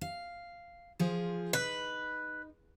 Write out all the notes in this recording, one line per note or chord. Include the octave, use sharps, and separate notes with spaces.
F5
F3 F4 G#4
D#4 B4